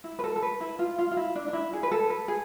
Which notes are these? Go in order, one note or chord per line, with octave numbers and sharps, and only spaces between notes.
E4
B4
A4
A4
B4
E4
F4
F4
F4
E4
D4
D4
E4
G#4
B4
A4
B4
G#4